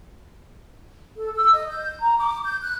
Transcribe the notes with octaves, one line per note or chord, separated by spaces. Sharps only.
A4
E6
D#5
G6
A#5
D6
G6
F#6